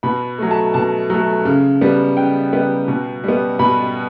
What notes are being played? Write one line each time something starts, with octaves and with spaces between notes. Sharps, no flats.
B2 B5
F#3 A3
A5
B2 A5
F#3 A3
C#3
G3 B3
C#3 G5
G3 B3
B2
G3 B3
B2 B5